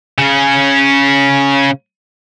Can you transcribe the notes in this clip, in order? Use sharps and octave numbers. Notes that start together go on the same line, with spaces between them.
C#3 C#4